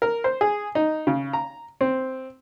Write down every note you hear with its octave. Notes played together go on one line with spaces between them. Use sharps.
A#4
C5
G#4
D#4
C#3
A#5
C4